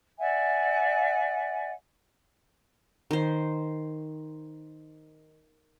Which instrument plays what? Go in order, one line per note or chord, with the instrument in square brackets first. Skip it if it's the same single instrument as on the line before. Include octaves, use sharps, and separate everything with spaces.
[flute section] D5 E5 F#5 G#5
[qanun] D#3 C5